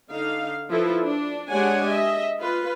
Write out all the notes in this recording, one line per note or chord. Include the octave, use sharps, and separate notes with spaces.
D3 D#4 F5
F3 E4 A4 B4
D4
G#3 D4 G4 C#5 F#5 G#5
D#5 E5
F4 B4